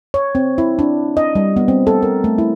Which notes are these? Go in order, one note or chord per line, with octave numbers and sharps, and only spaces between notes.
C#5
C4
E4
D4
D#5
G3
B3
C4
A4
A#4
A3
E4